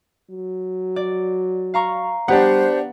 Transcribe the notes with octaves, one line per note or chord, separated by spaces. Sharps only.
F#3
D5
F5 A#5 C#6
G3 B3 D4 G4 C5 F#5